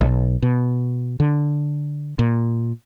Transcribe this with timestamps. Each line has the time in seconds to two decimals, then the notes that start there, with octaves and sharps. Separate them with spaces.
0.01 B1
0.42 B2
1.20 D3
2.19 A#2